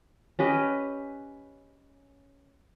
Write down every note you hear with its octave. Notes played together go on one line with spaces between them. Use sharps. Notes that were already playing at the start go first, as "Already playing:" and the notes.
C#4 G4 B4 D#5